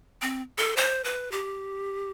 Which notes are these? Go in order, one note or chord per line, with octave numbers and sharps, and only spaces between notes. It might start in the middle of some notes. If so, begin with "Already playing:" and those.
C4
A4
C5
B4
G4